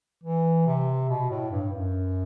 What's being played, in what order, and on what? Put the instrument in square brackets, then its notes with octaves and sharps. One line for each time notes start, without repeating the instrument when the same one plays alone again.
[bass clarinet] E3
C3
B2
A2
G2
F#2